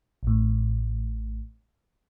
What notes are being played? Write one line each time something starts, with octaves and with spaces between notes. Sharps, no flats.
A1 A2